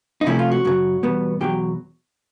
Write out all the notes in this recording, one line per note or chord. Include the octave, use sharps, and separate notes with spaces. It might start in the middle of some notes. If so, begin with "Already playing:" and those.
D#4
C3 F3 A3 C#4 E4
F4
F#4
F#2 C#3 F#3
E2 B2 G3 B3
E2 B2 F#3 G4